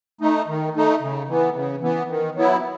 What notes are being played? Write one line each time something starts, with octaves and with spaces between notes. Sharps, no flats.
A3 D#4
D#3
A3 D#4
C#3
E3 B3
C#3
E3 B3
D#3
F#3 B3 E4